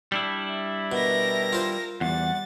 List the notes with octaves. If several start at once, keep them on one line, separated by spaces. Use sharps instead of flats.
G3 D4 E4
E5
B2 A#4 A#6
F4 C5
E2 G3 F#5 A6